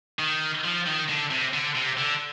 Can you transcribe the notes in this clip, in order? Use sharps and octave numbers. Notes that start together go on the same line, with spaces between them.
D#3
F3
D#3
D3
C3
D3
C3
D3